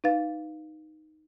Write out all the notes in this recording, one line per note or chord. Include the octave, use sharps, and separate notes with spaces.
D#4 B4 F5 A6